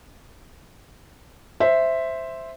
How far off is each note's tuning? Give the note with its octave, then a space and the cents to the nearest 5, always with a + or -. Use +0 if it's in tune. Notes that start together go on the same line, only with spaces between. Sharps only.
C5 +0 E5 +0